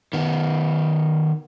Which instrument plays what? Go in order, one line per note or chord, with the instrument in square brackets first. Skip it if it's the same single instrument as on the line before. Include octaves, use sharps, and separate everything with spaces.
[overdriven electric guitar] D#3 B3